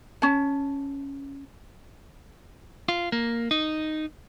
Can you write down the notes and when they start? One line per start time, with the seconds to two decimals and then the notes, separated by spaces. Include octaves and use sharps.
0.22 C#4 A5
2.89 F4
3.12 A#3
3.51 D#4